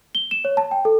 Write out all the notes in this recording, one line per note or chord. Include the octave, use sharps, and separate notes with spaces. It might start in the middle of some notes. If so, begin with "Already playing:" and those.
G7
E7
C#5
A5
G5
A4